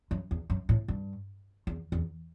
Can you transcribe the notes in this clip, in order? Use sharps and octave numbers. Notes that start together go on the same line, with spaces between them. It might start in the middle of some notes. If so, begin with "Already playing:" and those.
F#2
E2
F#2
A2
G2
E2
E2